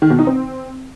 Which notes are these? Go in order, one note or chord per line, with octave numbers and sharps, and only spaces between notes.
D#3
B2
D#4
C4